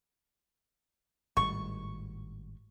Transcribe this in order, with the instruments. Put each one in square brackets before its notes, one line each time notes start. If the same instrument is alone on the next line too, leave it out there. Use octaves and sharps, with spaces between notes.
[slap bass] G#1 A2 G3 [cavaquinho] C#6